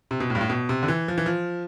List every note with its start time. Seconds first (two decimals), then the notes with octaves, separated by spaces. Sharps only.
0.11 C3
0.20 B2
0.30 A2
0.35 G2
0.41 A2
0.50 B2
0.69 C3
0.83 D3
0.88 E3
1.08 F3
1.18 E3
1.26 F3